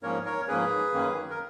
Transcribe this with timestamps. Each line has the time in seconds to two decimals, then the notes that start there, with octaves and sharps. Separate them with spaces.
0.03 G#2 F3 A#3 C#4 A#4 C#5
0.25 A#4 C#5
0.48 G#2 F3 A#3 C#4 G#4 B4
0.94 F#2 D#3 A#3 C#4
1.30 A#4